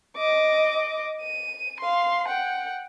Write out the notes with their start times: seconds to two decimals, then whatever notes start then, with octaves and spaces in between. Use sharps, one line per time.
0.17 D#5 D6
1.22 D#7
1.81 F5 C6
2.28 F#5 G5